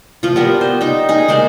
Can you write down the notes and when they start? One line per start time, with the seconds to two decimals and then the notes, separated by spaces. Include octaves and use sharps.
0.23 F3 F4
0.36 G3 B3 A#4
0.61 C5
0.81 D#4 G5
1.09 D#4 G#4
1.28 G#3 A#3 C5 D5